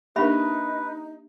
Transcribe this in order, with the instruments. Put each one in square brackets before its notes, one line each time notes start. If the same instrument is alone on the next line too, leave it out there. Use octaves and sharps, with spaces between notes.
[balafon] A#3 D4 A#4 [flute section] D#4 [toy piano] G4 E5 B5 [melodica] B4